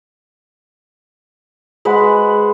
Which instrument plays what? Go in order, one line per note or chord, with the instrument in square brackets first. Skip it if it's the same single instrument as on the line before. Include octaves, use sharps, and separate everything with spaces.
[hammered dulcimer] G#3 B4 C5 F#5